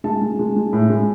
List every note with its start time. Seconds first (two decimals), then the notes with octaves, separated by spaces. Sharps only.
0.04 G#3 A5
0.21 G#3
0.39 G#3
0.56 G#3
0.73 A2
0.90 G#3